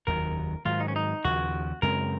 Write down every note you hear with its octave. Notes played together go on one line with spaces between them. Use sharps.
F1 D#2 D#3 F#3 A#4
G#2 D#3 F#3 F4
D#4
C#4
D#4
D#2 C#3 F3 F#4
F#2 C#3 G#3 C4 A#4